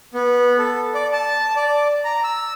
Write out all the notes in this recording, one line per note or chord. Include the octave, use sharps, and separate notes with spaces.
B3
A4
D5
A5
D5
A#5
E6